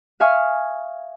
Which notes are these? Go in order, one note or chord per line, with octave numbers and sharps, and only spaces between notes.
E5 F5 G#5 C#6 D#6 F6